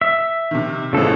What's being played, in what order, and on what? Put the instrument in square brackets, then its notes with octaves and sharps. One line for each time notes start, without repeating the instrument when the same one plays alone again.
[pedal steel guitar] E5
[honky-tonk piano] C3 D#3
[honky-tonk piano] A1 E3 F3 [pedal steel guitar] C#3 A4